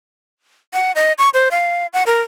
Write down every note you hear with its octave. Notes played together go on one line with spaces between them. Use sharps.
F#5
D#5
C#6
C5
F5
F#5
A#4